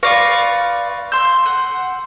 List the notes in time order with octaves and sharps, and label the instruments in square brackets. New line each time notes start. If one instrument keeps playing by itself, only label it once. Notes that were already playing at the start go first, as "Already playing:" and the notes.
[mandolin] F4 D5 F5 [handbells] B4 C#6 A#6
[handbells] C6 G6 [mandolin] E6
[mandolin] F#5